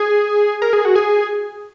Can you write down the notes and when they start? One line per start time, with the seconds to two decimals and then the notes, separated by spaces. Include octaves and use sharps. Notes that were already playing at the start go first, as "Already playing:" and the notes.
Already playing: G#4
0.62 A#4
0.73 G#4
0.85 F#4
0.95 G#4